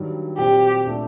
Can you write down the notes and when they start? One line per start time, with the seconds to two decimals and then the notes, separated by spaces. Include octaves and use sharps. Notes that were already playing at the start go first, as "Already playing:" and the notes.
Already playing: G2 D#3 F#3
0.38 A#2 F#3 C4 G4
0.86 A#2 A3 D4